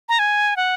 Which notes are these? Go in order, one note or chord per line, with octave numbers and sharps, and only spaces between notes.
A#5
G#5
F#5